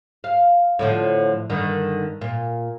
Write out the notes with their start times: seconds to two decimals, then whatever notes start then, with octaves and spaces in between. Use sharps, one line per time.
0.24 F5
0.79 A2 D3 F3
1.49 G2 D3 D#3
2.21 A#2